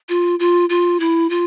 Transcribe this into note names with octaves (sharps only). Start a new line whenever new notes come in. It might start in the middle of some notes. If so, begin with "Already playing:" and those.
F4
F4
F4
E4
F4